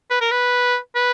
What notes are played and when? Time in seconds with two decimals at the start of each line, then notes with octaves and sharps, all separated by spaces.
0.10 B4
0.21 A#4
0.31 B4
0.96 B4